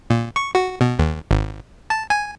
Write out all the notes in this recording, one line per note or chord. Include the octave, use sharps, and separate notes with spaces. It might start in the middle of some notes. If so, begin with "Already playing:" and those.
A#2
C#6
F#4
B2
D#2
G#1
A5
G#5